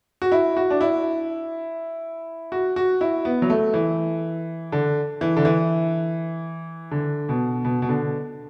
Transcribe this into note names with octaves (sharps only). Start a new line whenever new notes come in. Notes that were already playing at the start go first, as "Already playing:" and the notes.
F#4
E4
F#4
D4
E4
F#4
F#4
E4
B3
F#3
A3
E3
D3
E3
D3
E3
D3
B2
B2
B2
D3